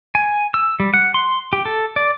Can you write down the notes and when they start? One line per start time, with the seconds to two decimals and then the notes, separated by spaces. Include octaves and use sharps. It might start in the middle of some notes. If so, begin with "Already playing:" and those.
0.15 G#5
0.54 E6
0.80 G3
0.94 F#5
1.14 C6
1.53 G4
1.65 A4
1.96 D5